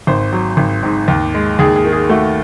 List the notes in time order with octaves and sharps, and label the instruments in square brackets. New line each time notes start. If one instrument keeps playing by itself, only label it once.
[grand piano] G#1 C5
F#3
G#1
G#2
D#2
G#3
D#2 G#4
G#4
D#3
G#4
A3 F#4